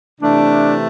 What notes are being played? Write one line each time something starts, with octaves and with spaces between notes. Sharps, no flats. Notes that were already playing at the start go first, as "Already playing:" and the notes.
C3 E3 A3 D4